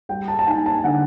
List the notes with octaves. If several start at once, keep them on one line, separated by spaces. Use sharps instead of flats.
G3 G5
A5
A5
D#4 G#5
A5
D3 F#5